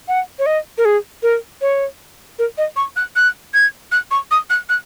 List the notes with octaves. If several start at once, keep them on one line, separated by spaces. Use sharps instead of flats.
F#5
C#5
D#5
A#4
G#4
A#4
C#5
A#4
D#5
C#6
F#6
F#6
G#6
F#6
C#6
D#6
F#6
F#6